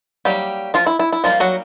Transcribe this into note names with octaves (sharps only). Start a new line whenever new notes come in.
F#3 G3 A#3 D#4 G4
F3 F4
E4
E4
E4
F3 G3 A#3 D#4 F4
F#3 F#4